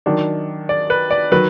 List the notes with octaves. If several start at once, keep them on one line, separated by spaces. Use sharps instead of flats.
D#3 F#3 D4
D5
B4
D5
D#3 F#3 B4